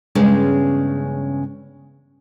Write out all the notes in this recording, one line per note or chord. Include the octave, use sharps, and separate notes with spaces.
E2 G2 C#3 G#3 C#4